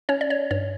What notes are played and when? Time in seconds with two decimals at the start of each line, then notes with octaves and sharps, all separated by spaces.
0.09 C#4 C#5
0.21 D5
0.30 C#5
0.51 G2 C#5